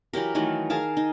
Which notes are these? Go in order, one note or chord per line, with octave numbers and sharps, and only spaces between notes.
E3 F#3 G4 A#4
D#3 E3 F#3 A3
G#4 A#4 F5 A5
D#4